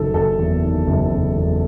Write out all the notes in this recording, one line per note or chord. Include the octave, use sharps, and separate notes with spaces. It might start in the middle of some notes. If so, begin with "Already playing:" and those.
Already playing: F#1 D#3 A4
F#1 A4
E2
D#3
F#1
F#1
E2